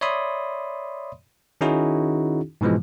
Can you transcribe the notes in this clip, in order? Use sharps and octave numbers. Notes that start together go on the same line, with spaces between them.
C#5 D5 E5 B5 C6 D#6
D#3 C#4 D#4 E4 F#4 G#4
G#2 B2 E3 F3 G#3